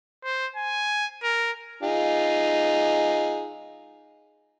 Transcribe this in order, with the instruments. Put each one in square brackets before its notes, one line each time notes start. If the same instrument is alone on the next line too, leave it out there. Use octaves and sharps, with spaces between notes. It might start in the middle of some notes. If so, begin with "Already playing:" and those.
[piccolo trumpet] C5
G#5
A#4
[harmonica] D#4 F4 G#4